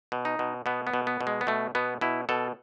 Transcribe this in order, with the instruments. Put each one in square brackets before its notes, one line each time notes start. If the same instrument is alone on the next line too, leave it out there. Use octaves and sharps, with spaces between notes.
[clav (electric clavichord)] B2
D#4
B2
B2 B3
B3
B2
B3
B2
G#3
B3
B2 A3
B2 B3
B2 E4
B2 A4